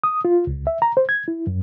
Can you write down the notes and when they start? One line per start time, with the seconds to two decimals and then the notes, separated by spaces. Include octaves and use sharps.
0.04 D#6
0.25 F4
0.47 C#2
0.67 E5
0.82 A#5
0.97 C5
1.09 G#6
1.28 E4
1.47 F#2